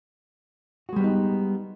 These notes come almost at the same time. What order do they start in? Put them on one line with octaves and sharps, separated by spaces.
F#4 G#3 G3 B3 D#4